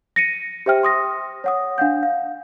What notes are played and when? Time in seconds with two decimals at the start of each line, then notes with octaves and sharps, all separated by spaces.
0.16 A#6 C#7 D#7
0.66 G4 C5 E5 G5 F6
0.83 C6 D#6 A#6
1.44 C#5 F#5 D#6
1.78 D4 F5 F#5 G6
2.03 F5